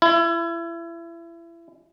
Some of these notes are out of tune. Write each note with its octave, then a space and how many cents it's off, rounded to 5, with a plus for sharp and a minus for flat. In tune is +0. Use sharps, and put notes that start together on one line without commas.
E4 +30